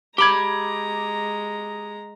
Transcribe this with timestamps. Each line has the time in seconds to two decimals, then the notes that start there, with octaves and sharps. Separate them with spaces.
0.18 G#3 G4 A#5 B5 D6 G#6